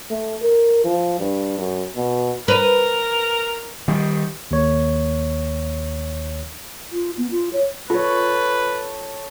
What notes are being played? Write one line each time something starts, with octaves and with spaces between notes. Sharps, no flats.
A3
A#4
F3
G2
F#2
B2
A#4 B4
D#3 G3
D#2 C#5
F4
B3
F4
C#5
F4 A4 B4 C#5